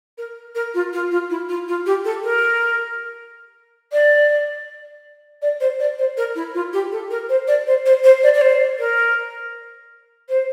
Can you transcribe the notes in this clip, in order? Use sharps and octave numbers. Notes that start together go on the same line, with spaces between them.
A#4
A#4
F4
F4
F4
E4
F4
F4
G4
A4
A#4
D5
D5
C5
D5
C5
A#4
E4
F4
G4
A4
A#4
C5
D5
C5
C5
C5
D5
D5
C5
A#4
C5